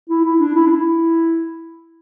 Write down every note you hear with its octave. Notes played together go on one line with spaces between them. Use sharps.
E4
E4
D4
E4
D4
E4